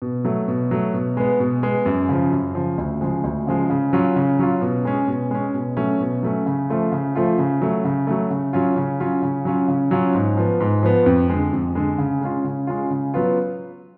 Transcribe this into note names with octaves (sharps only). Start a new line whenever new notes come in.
B2
F#3 A3
B2
F#3 A3
B2
G#3 B3
B2
G#3 B3
F#2
C#3 F3
F#2
C#3 F3
D2
C#3 F3 G#3
D2
C#3 F3 G#3
C#3
F#3 C#4 F4
C#3
F#3 C#4 F4
B2
G#3 C#4
B2
G#3 C#4
B2
F#3 A3 C#4
B2
F#3 A3 C#4
C#3
F3 A3 F4
C#3
F3 A3 F4
C#3
F#3 A3
C#3
F#3 A3
C#3
F#3 C#4 F4
C#3
F#3 C#4 F4
C#3
F#3 C#4 F4
C#3
F#3 C#4 F4
G#2
F3 B3
G#2
F3 B3
F2
D3 G#3
F2
D3 G#3
C#3
G#3 C#4 F4
C#3
G#3 C#4 F4
C#3
F#3 B3 F4